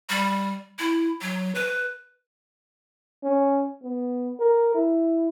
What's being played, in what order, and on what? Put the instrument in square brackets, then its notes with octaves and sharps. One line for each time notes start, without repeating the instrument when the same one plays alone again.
[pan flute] G3
E4
F#3
B4
[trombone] C#4
B3
A#4
E4